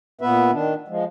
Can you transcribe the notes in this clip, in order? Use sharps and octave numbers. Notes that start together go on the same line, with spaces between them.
A#2 B3 B4 E5
D#3 D4
F3 G#3